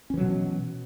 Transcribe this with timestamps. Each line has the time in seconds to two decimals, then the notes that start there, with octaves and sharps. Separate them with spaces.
0.10 C#4
0.14 E3
0.17 F#3
0.21 B2